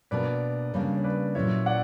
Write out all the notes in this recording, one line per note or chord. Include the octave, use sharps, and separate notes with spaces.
B2 A#3 D4 A#4 B4 D5
C#3 G3 A#3 D4 C#5
C#5
B4 D5
A#2 F#3 C#4 E4 A#4 C#5 E5
D5 F#5